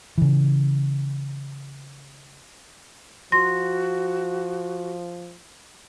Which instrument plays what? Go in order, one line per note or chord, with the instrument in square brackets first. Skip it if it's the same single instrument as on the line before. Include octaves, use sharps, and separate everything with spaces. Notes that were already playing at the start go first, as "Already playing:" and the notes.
[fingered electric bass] C#3 E3
[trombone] F3 [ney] F#4 [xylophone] C6 [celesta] A#6